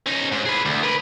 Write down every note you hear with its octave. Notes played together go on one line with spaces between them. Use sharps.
C#4 D#4
G#2
G#4 B4
D2
A#4 B4